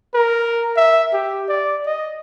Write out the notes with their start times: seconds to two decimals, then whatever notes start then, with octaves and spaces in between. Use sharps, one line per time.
0.14 A#4
0.77 E5
1.13 G4
1.49 D5
1.86 D#5